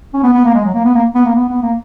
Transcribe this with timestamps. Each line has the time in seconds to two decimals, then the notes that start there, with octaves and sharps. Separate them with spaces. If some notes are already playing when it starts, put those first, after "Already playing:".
0.14 C#4
0.23 B3
0.34 B3
0.45 A#3
0.54 G#3
0.65 F#3
0.74 A#3
0.85 B3
0.95 A#3
1.15 B3
1.25 A#3
1.35 B3
1.49 B3
1.62 A#3